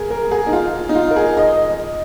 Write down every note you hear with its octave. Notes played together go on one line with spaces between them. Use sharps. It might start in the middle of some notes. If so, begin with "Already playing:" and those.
Already playing: G#4 A#4
A#4
G#4
D#4
F4
D#4
F4
A#4
G#4
D#5